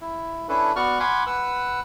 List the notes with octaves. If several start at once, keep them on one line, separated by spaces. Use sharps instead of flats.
E4
C#4 D4 E4 A4 B4
B3 F#4 D5 F#5 C#6 F6
F5 F#5 G#5 B5 C6 D6
B4 F#5 E6